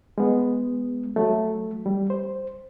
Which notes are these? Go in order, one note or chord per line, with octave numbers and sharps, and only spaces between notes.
G#3 B3
F#3 A3
G3
C5